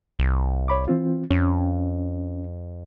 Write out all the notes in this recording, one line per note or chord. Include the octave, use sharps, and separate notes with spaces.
C2
C#5 B5 D6
E3 C4 F4
F2 C#4